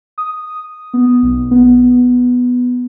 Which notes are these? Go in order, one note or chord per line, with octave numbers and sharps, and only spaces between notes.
D#6
B3
B1
B3